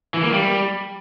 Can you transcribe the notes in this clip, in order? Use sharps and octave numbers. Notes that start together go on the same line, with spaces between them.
E3
A#3
G3